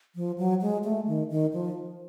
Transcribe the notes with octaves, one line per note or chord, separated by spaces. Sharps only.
F3
F#3
G#3
A3
D#3
D#3
F3